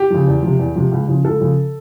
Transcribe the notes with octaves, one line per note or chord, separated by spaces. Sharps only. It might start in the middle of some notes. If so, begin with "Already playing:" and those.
Already playing: G4
C#3 F3
E2
C3 F3
E2
C3 F3
C#2
C#3 F3
C#2 A4
C#3 F3